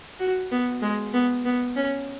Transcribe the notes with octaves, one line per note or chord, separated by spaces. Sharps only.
F#4
B3
G#3
B3
B3
C#4